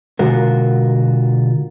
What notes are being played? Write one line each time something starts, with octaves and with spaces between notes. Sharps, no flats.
B2 D3 G#3 F4 F#4 A#4